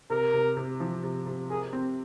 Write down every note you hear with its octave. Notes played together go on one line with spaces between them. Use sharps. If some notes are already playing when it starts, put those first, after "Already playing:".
C3 A#4
C3
C3
F3
C3
C3
G#4 A#4
C4